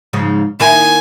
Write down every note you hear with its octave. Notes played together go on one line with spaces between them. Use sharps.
G#2 C#3 F3
D#3 A#3 E4 G#5